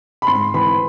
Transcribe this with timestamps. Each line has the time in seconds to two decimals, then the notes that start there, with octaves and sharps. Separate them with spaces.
0.22 B5
0.27 G#2 C6
0.54 E3 B5